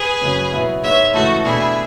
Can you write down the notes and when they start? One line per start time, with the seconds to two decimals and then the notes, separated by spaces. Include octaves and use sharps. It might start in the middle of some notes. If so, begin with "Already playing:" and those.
Already playing: G#4 B4
0.21 F#2 C#3 F#3
0.52 B2 F#3 B3 E4
0.83 G#2 G#3 B3 C#5 E5
1.14 C#2 C#3 E3 A3 F#4 A4
1.44 B2 A3 D4 E4 G#4